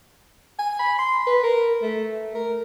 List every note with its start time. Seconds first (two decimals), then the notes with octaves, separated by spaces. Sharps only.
0.59 G#5
0.79 B5
0.98 C6
1.27 B4
1.43 A#4
1.82 A3
2.35 A#4